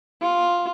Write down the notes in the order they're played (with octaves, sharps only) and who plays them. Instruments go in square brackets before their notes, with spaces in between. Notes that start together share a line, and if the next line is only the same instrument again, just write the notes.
[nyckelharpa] F4